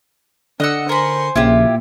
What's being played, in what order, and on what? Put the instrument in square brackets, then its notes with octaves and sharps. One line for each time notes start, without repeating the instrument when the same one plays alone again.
[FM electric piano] D3 C#7 [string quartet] D4 [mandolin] D#5 F#5 E6
[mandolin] A#4 B5 [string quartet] C5 G#5 C6
[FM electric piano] A#1 C#3 [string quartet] A#2 [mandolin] E4 F4 G4